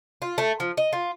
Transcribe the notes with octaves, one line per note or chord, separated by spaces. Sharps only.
F4
A3
F3
D#5
F4